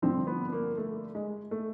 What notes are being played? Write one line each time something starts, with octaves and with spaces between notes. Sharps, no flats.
G2 D3 F3 C4
B3
A#3
A3
G#3
A3